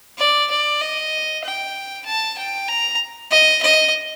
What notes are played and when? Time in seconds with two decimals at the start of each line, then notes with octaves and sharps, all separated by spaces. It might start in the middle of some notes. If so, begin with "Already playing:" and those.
0.18 D5
0.50 D5
0.81 D#5
1.44 G5
2.06 A5
2.38 G5
2.68 A#5
3.31 D#5
3.62 D#5